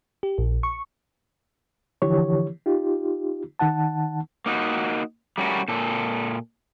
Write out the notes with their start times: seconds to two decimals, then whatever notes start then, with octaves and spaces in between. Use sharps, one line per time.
0.23 G4
0.38 A#1
0.63 C#6
2.02 D3 E3 F3 E4 G4 C#5
2.66 D#4 F4 G4
3.59 D#3 D#4 F#5 A5
4.46 A#3 D#4 F#4
5.38 G3 A3 C#4 F#4 G4 A#4
5.68 A#2 A4